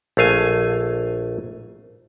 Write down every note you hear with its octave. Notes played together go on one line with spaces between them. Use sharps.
A#1 A3 F5 G#5